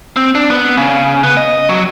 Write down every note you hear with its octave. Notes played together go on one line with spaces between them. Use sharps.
C4
D4
B3
C#3
B3
D#5
F#3